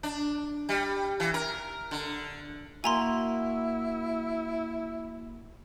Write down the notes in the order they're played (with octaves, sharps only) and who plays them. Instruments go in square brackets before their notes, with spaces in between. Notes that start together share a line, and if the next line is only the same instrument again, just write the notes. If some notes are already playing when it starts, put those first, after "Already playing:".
[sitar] D4
G3
E3
A#4
D3
[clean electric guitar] A#3 F#4 [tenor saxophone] E4 [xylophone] G#5 A#5 C6